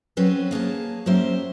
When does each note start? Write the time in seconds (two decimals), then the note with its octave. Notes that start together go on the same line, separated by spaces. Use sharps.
0.17 F#3 C4 C#4 B4 C5
0.51 A#3 G#4 C#5 A5
1.06 F#3 A#3 C#4 G4 C5 E5